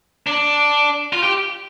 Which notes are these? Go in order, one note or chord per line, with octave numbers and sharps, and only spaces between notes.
D4
F4
G4